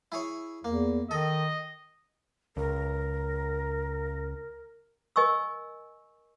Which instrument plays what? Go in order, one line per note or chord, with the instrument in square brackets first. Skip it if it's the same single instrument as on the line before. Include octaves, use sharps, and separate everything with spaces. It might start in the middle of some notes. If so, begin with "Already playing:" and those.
[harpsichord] E4 G#4 C#5
[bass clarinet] E2 [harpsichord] A#3
[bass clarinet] D#3 [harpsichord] A4 [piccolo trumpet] D#5
[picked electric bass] C#2 [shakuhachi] A#4
[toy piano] A#4 D#5 G#5 C#6 E6